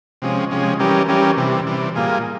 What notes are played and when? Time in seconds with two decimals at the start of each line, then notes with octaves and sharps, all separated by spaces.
0.22 C3 F3 G#3 C#4
0.51 C3 F3 G#3 C#4
0.80 E3 G3 C#4 G4 A#4
1.08 E3 G3 C#4 G4 A#4
1.37 C3 E3 G3
1.67 C3 E3 G3
1.95 A#2 G3 A#3 F4 G#4